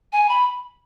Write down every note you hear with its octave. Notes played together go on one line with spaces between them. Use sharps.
G#5
B5